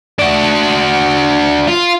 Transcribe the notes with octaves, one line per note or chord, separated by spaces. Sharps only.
D4 F#4
F4